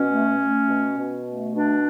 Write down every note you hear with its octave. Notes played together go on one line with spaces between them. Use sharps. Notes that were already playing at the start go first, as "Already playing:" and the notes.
Already playing: B2 C#4
A3
A3
B2
B2
A3
B2 D4